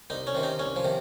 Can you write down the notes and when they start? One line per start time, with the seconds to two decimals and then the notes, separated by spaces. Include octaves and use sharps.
0.10 C2 D#4
0.27 C#4
0.35 C3 D#3
0.43 D#4
0.59 C2 C#4
0.76 F3
0.84 C3 D#3